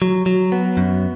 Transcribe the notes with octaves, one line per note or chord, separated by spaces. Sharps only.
F#3
F#3
B3
F#2